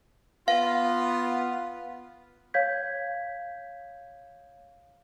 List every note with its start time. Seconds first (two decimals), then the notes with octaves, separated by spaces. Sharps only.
0.48 B3 F4 F5
2.54 C#5 F5 G6 G#6 B6